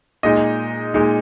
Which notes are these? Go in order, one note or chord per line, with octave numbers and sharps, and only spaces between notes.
A#2 G#3 D#4 D#5
A#2 G#3 D#4